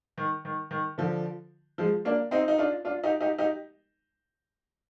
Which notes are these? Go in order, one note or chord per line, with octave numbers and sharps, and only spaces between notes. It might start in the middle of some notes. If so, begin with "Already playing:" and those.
D#3
D#3
D#3
D3 F3
F3 G#3
A#3 D4
C4 D#4
D#4
D4 F4
D4 F4
D#4 G4
D#4 G4
D#4 G4